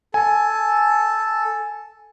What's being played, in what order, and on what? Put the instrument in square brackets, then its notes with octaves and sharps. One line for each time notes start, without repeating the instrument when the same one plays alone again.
[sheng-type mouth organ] A4 [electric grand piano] G#5